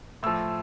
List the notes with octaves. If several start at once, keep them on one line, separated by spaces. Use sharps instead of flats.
A2 F3 E6